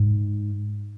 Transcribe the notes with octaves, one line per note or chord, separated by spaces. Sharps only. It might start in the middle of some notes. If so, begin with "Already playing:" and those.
Already playing: G#2